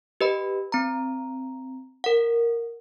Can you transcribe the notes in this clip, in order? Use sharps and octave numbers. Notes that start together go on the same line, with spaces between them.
G4 B4 D#5 B5
C4 A#5
A#4 F#5